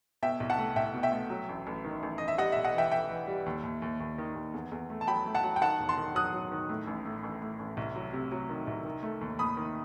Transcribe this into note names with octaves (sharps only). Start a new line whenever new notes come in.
B2 E5 G5
C2
F#5 A5
A3
C2 E5 G5
B2
E5 G5
A3
F#3
A1
A1
D#3
A1
A1 D#5
E5
G3 D#5 F#5
B1 E5
D#5 F#5
E3 E5 G5
E3 E5 G5
E3
G3
D#2
D#2
D#2
D#2
D#3
D#2
E2
E2
A3
A5
F#3 G5 B5
A3
F#5 A5
F#3
G5
D#3 F#5 A5
E1
A5 C6
D#3
F#3 D#6 F#6
F#3
D#3
A2
A1
A2
A1
A2
A1
C2
F#3
C3
F#3
D#3
C2
D#3
A3
D#2
D#2 B5 D#6
D#3